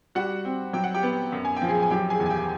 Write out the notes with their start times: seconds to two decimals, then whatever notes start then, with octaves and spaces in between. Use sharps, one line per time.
0.15 G3 F#4 F#5
0.45 C4
0.73 F#3 G5
0.84 F#5
0.94 G4 G5
1.03 B3
1.32 F#2
1.45 G#5
1.56 G5
1.62 F3
1.69 G#4 G#5
1.82 G#5
1.90 F#3 G4 G5
2.10 G#4 G#5
2.20 E2
2.26 G#5
2.30 G4 G5